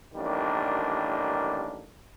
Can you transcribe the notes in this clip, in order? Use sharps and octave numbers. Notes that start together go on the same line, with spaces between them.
A1 D#3 G3 A#3 D4